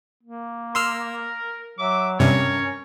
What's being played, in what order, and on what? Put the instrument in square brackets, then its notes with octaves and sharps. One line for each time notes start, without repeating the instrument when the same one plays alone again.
[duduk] A#3
[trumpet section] A#4 [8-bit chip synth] C6 E6 F6
[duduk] F#3 [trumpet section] E5 D6
[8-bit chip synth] G2 C3 [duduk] C#4 [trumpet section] A#4 C#5